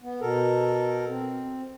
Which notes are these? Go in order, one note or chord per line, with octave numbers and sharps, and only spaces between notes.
B3
B2 A4 A#4
C4